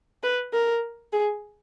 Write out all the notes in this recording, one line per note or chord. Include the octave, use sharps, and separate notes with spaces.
B4
A#4
G#4